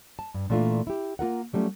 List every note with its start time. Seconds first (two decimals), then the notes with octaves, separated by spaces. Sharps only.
0.19 A5
0.34 G2
0.50 A#2 E3 A3 D4 F4
0.87 E4 G4
1.19 A#3 F4 A#4 F#5
1.53 F#3 G3 A3 C#4 F4